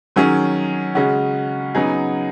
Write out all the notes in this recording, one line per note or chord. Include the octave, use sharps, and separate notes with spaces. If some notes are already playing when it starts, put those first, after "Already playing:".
D#3 F#3 C#4 G#4
C#3 G#3 C#4 F#4
C#3 F#3 B3 D#4 G#4